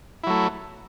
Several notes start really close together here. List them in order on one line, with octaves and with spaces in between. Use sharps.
E4 F#3 A3